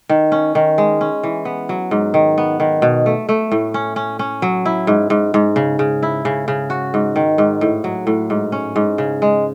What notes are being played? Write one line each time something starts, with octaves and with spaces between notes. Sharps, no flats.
D#3
C#4
D#3
G#3
C#4
E3
B3
F#3
G#2
D#3
B3
D#3
B2
A3
A3
A2
C#4
C#4
C#4
F#3
E4
G#2
G#2
G#2
C#3
C#3
E4
C#3
C#3
F#4
G#2
D#3
G#2
A2
F#3
A2
G#2
C#4
G#2
C#3
G#3